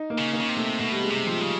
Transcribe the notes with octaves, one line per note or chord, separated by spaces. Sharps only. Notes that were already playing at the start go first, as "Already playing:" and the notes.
Already playing: D#4
A#3
C#3
A#3
C#3
C3
A3
B2 A3
G3
G#3
C3
F3
C#3 G3